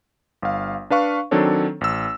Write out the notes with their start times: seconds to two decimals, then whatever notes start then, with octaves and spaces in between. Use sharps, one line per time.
0.42 G1 F5
0.90 D4 B4 F5 C#6
1.31 D#3 F#3 C4 D4 A4 C#5
1.81 A1 E6